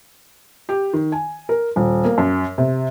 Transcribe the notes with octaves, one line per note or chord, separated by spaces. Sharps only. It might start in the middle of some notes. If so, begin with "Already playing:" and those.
G4
D#3
G#5
A#4
D#1
A#3
F#2
C3